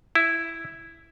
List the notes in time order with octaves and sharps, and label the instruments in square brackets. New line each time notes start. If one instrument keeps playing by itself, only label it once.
[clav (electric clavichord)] E4